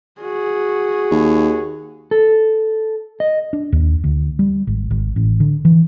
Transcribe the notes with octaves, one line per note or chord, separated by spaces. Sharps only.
F#4 G#4
D#2
A4
D#5
D4
D#2
D2
G3
G#1
G#1
A1
D3
E3